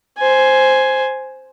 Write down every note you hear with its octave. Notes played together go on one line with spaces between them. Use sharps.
C5 G#5